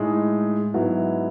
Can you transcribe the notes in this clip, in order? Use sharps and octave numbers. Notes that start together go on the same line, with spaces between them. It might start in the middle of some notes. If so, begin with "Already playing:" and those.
Already playing: A2 G#3 D#4
G#2 F#3 B3 E4